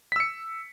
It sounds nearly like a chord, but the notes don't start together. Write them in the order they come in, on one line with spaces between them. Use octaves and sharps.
B6 E6 C#7